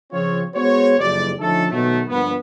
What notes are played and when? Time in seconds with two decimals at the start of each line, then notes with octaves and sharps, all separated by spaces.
0.12 C#3 F3 C4 F4 C#5
0.54 G#3 B3 F#4 C5 C#5
0.98 F#1 F2 G4 D5
1.40 D3 F3 A3 C#4 D#4 A4
1.71 B2 D#3 F#3 A3
2.08 G1 G2 F3 A#3 B3